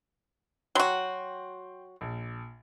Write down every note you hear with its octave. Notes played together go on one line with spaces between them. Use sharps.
F#3 F#4 G5 C6
A#1